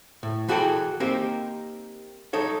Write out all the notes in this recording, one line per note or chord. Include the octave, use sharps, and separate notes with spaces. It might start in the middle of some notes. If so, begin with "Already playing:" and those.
A2
E3 F#4 G#4 A4 G5
A#3 C4 D#4 G4 A#4
D#4 A4 C#5